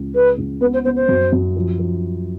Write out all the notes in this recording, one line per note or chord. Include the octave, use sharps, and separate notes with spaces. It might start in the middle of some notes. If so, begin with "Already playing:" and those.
Already playing: C#2
C#3 B4
C#2
B3 B4
C5
B3 C5
C5
F#2
F#2
F3
F3